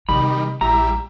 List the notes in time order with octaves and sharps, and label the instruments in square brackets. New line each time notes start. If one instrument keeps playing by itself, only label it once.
[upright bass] C3 G#3 [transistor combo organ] D#3 G3 [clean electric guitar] B5
[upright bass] A#1 [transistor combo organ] G3 E4 [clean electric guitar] A#5